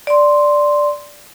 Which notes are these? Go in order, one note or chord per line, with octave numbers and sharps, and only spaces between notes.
D5 C6